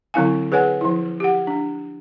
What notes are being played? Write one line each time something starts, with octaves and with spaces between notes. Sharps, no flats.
D3 F#3 C4 E4 F5 G#5
G#4 B4 C#5 F#5 G#5
F3 E4
G4 F#5
D4